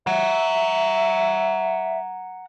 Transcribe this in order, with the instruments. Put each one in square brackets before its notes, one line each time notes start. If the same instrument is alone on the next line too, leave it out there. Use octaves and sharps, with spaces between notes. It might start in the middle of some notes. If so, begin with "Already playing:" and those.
[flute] E5 [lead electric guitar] F#5 A#5